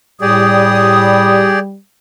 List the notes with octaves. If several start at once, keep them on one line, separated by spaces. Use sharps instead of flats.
A2 G3 G4 G#4 D5 D#6